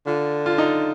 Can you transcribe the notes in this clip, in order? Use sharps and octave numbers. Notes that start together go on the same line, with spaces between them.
D3 F4
F4
D#4